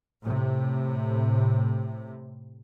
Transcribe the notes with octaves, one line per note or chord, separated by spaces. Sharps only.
A2 C3